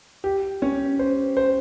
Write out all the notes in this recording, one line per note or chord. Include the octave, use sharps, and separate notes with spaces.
G4
C#4
C5
C5